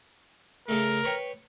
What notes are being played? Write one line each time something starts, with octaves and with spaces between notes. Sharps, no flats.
C#3 A3 A#4
B4 C#5 G5